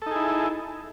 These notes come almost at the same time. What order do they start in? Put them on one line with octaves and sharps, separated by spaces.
A4 D#4 G#4 E4